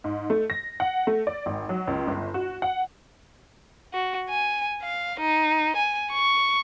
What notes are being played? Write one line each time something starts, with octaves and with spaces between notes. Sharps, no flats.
G#2
A3
A#6
F#5
A3
D5
G#1
F#3
C#2
G1
F#4
F#5
F#4
G#5
F5
D#4
G#5
C#6